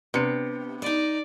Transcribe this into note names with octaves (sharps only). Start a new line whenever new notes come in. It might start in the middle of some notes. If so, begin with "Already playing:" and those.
C3 B3 D4 C#7
D#4 D5 D#5